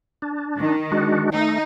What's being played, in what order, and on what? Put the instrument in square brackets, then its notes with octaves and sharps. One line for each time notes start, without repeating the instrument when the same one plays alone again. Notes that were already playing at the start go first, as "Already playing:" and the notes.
[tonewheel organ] D4
[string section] D#3
[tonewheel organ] G#3 D4 F#4
[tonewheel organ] A3 [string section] D#4